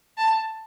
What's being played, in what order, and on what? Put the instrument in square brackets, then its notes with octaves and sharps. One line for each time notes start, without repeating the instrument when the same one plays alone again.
[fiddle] A5